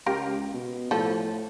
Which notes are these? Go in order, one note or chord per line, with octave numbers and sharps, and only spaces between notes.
C#2 G4 A#4 F5
B2
A2 F3 A4